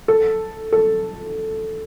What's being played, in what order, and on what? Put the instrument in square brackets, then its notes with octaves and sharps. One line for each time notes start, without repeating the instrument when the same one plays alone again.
[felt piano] A4
A4